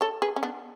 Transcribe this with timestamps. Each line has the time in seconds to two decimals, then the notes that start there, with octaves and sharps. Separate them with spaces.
0.01 A4 C#5
0.22 G#4 B4
0.36 C#4
0.43 B3 D4